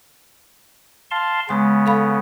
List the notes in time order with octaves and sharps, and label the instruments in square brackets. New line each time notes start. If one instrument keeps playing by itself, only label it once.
[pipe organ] F5 A5 C6
[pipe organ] C#3 B3 [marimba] G#3 C6
[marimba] A4 F5 B5